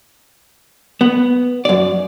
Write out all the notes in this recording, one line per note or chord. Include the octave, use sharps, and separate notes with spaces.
B3
F#2 D5